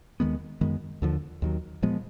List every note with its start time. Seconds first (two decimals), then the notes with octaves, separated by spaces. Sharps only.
0.20 D#2 D#3 G#3 B3
0.61 F#2 D#3 G#3 B3
1.02 D#2 D3 F3
1.42 D#2 D#3 F#3
1.82 A#2 F3 G#3 B3